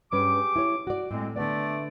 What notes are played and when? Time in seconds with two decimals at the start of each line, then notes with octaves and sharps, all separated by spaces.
0.12 G2 C#4 G4 G#4 B4 D6
0.56 E4 C#5
0.87 F#4 D5
1.11 A2 G#3 C4
1.36 D3 A3 B3 D5